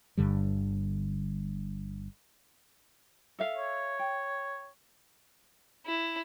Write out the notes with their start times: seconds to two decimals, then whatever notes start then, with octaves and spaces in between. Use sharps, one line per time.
0.17 G1 G2 D3 G3
3.39 A4 E5 F5
3.56 C#5
3.99 G5
5.86 E4